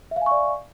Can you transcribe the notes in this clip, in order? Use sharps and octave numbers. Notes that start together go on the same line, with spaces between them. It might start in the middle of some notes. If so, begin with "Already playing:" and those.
D5 E5 F5 G#5 C#6